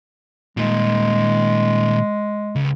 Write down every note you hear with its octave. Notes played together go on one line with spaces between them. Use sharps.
A#2 D#3 G#3
C#2